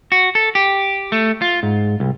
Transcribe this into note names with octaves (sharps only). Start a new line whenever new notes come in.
F#4
A4
G4
A3
F4
G#2
C2